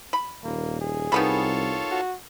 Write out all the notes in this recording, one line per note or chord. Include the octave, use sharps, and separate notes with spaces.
B5
D#1 A#3
G#4
C2 D#3 B3 F4 A4 C#5 B5
F#4